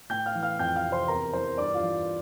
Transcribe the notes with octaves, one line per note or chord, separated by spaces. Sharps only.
A2 G5 G6
F5 F6
E3
F5 F6
F2 G5 G6
F5 F6
C3
C5 C6
E2 A#4 A#5
E3 C5 C6
G2 D5 D6
F4 F5
E3